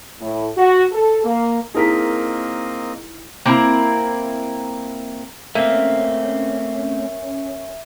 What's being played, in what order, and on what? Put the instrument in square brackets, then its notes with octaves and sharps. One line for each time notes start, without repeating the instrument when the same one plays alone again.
[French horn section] A2
F#4
A4
A#3
[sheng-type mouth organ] A#3 C4 D#5 [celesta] D#4 E4 B6 [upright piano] G#4 A#4
[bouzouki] A#3 C4 E4 A#4
[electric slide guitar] A3 C4 [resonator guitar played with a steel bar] A#3 [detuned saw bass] C#4 [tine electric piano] E5